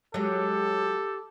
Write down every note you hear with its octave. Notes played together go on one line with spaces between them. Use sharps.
F#3 G#3 G4 A4